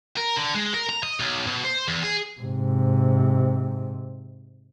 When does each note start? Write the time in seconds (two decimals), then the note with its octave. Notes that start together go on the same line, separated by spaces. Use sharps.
0.17 A#4
0.37 D3
0.55 G#3
0.74 A#4
0.89 A#5
1.03 D#5
1.19 B1
1.46 B2
1.64 C5
1.88 E2
2.03 G#4
2.40 G#2 C3